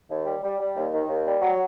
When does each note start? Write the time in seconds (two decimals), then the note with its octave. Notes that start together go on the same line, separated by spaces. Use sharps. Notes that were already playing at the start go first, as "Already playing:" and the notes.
0.09 D#2
0.26 G3
0.43 G3
0.59 G3
0.76 D#2
0.92 D#3
1.08 D#2
1.26 G3
1.42 F#3